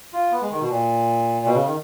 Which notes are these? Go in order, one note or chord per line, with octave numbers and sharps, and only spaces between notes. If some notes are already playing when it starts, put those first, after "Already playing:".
F4
B3
G#3
D#3
B2
A#2
B2
C#3
D#3